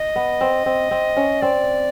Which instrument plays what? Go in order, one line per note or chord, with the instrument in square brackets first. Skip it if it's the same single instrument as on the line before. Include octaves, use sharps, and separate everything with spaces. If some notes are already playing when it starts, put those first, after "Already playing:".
Already playing: [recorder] D#5
[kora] B3
C4
C4
C4
C#4
[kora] C4 [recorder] D5